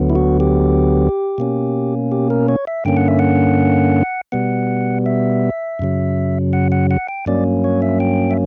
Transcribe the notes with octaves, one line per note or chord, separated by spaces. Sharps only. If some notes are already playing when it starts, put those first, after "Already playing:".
Already playing: D2 D3 F#3 B3
E4
F#4
G4
B2 A#3 C#4
G4
A#4
C#5
E5
G2 D3 A#3 C#4 G5
F#5
E5
F#5
B2 G3 B3 F#5
E5
F#2 C#3 F#3
F#5
F#5
F#5
G5
G2 F#3 A#3 C#4 D5
C#5
E5
G5
E5